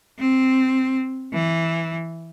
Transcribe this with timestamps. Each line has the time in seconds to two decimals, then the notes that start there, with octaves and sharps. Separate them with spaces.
0.19 C4
1.33 E3